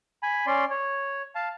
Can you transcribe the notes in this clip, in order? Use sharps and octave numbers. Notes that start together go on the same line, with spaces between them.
G#5 B5
C#4 D5 C6
C#5
F5 A5